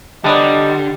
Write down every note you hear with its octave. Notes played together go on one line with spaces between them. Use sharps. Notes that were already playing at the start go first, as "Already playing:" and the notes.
D3 F#3 G3 B3 D4 D#5